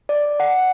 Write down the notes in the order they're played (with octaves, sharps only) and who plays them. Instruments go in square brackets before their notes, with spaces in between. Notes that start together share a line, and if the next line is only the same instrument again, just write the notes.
[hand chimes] D5
F#5